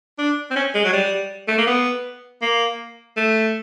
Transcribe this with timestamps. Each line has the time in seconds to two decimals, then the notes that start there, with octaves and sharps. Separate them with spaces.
0.19 D4
0.51 C4
0.56 C#4
0.75 G#3
0.85 F#3
0.93 G3
1.48 A3
1.58 A#3
1.67 B3
2.42 A#3
3.17 A3